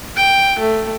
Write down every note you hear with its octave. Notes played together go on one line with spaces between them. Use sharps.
G5
A3